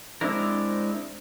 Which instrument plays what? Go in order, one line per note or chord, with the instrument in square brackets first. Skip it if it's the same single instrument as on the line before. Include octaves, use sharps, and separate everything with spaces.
[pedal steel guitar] G#3 C4 D4 E4 A#4